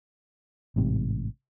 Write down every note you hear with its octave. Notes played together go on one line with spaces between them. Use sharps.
A1 G#2 C3